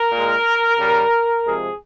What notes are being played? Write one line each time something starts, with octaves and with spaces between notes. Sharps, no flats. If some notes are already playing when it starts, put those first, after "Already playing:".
Already playing: A#4
A#2 G#3
C#3 G3
C3 F3 G#3 G#4